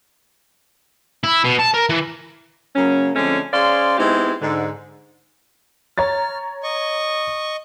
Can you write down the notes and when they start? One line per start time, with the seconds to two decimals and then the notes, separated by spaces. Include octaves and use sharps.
1.24 E4
1.45 B2
1.60 A5
1.74 A#4
1.90 E3
2.75 C#3 F#3 A#3 C#4
3.15 D3 F3 G#3 A3 C4 C#4
3.52 C#4 G#4 C5 D5 F5 C6
3.98 G#3 B3 C4 D#4 E4 G4
4.41 G#2 D3
5.98 C#5 A#5 F6 A6
6.63 D#5 C#6